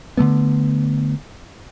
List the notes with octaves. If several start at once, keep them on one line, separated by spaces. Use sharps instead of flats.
D3 E3 A3 B3